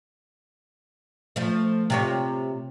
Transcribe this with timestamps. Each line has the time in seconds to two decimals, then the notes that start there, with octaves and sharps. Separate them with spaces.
1.36 F3 A3
1.90 C3 F4 C#5